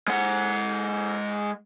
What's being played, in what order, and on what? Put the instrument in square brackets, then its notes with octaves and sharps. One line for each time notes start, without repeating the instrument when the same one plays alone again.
[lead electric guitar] G#3 F#5